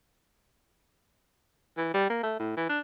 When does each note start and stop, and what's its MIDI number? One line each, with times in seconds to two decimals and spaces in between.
1.77 1.94 52
1.94 2.05 55
2.10 2.18 58
2.23 2.35 57
2.39 2.52 45
2.57 2.65 52
2.69 2.80 62